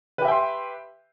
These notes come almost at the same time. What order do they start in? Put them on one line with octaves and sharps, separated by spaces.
B4 G4 E5 G5 C6